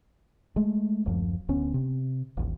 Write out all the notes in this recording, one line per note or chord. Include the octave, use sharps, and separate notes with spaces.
G#3 A3
D1 F#2 F3
D1 D2 B3 C#4
C3
D#1 A1